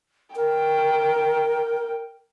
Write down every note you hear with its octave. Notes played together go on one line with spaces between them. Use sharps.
A#4 G5